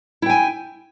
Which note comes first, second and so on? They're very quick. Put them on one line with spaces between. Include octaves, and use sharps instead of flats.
E4 G5 G#5